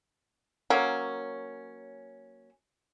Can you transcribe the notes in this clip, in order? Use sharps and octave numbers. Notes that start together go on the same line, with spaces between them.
F#3 A#3 C#4